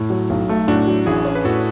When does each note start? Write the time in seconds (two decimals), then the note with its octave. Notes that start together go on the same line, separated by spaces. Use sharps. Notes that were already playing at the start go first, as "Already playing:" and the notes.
Already playing: A2
0.10 F#3
0.30 B1
0.49 A3
0.68 A2 D4 F#4
0.87 F#3
1.06 A1 E4 G#4
1.25 C#4
1.35 B4
1.45 A2 F#4 A4